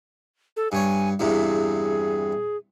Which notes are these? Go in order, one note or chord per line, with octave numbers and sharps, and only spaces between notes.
A4
G2 C#5 G#5
E2 G2 C3 G#4